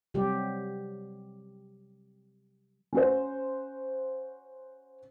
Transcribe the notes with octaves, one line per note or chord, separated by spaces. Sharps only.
C3 F#3 G3 G4
C#4 F#4 C5